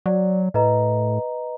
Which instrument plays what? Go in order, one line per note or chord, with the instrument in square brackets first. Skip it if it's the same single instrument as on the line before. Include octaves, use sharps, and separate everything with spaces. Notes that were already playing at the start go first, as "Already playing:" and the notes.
[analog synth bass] F#3 [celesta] D5
[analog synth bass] A2 [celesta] B4 D#5 A#5